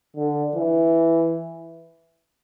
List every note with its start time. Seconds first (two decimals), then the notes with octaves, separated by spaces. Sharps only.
0.17 D3
0.56 E3